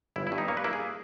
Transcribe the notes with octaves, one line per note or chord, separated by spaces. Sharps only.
G1 E4
E4
G2
D#4
A#3 C#5
B4
A#3 E4
G#4